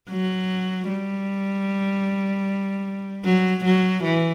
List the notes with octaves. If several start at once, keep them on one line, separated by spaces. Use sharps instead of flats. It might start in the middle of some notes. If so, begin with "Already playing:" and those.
F#3
G3
F#3
F#3
E3